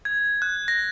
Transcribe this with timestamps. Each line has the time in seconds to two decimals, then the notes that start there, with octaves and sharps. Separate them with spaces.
0.05 G#6
0.42 F#6
0.68 A#6